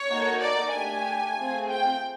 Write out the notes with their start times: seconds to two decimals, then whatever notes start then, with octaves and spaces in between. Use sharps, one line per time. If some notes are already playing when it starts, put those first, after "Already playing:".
Already playing: C#5
0.08 A#3 D#4 F#4 A4
0.41 D5
0.72 A3 D4 G4 G#5
1.37 A3 C4 F4 G#4
1.68 G5